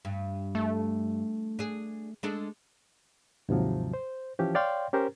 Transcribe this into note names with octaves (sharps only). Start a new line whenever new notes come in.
G2
A3
D4 G#4
G#3 D4 A4
D#2 G#2 C3 F3 F#3
C5
E3 F3 C#4 G4
C#5 D5 F5 G5 C6
C#4 G4 A#4 C5